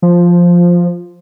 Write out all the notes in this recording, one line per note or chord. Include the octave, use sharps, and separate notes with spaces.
F3